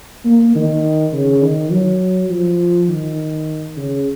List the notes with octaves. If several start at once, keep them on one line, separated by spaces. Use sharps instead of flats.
A#3
D#3
C#3
D#3
F#3
F3
D#3
C#3